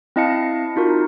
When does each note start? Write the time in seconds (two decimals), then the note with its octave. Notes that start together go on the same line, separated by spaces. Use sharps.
0.16 C4 E4 D#5 F5 A5 C#7
0.76 D#4 F4 F#4 A#4